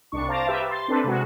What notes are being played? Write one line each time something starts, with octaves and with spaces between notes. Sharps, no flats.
C2 D4 C#6
C5 F5 A5 A#5 D6 A6
G4 B4 E5
C6 A6
C4 D4 A4 B4
C3 G#3 F#4